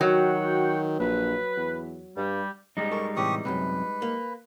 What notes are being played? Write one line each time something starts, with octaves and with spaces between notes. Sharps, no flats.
D#3 F#3 F#4 F#5 G5
A#1 B4
E2
G2 G3
G3 G#3 D#4
A4 A#4 C#6
A2 C3 E3 G4 C#6 D#6
F#2 A2 C3 B4
A#3